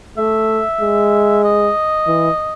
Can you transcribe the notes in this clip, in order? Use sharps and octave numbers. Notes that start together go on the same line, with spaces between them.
A3 E5
G#3
D#5
E3